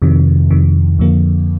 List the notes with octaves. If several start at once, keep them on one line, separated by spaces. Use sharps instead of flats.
F2 C3 D#3
F2 C3 D#3
F2 D3 F3 A#3